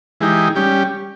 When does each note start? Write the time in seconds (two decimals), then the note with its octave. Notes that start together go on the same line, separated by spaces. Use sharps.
0.21 E3 G#3 D#4 G4
0.55 G3 C#4 G4